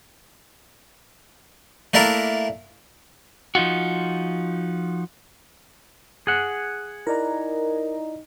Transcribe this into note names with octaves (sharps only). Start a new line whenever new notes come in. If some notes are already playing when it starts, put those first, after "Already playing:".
A3 A#3 D4 E4 A#4
F3 D#4 F4 F#4
G#4 F#5
D#4 E4 A#4 D5 A#5